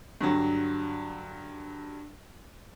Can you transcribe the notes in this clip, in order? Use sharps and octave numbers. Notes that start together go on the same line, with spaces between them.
G2 D3 F#3